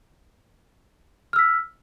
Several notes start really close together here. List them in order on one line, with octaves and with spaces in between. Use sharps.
F6 E6 B6